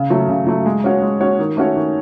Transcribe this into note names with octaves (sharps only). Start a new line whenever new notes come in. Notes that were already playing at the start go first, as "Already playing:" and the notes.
Already playing: C#3
F#3 A3
C#3
F#3 A3
G#3
C#4 F#4 C#5
G#3
C#4 F#4 C#5
D#3
A3 C#4 F#4 C#5
D#3